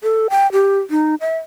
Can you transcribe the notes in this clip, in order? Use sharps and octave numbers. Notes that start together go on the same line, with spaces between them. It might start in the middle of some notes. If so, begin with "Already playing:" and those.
A4
G5
G4
D#4
E5